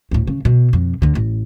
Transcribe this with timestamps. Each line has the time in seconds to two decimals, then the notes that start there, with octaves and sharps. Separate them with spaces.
0.11 D2 A2
0.27 C#3
0.45 B2
0.73 F2
1.02 D2 D3
1.15 A1